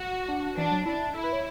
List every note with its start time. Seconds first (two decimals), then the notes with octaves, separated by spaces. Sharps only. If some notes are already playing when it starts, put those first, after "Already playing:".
Already playing: F#4
0.28 D4
0.57 E3 D4
0.71 F#3
0.86 D4 E4
1.14 E4 A4
1.24 B4
1.33 C#5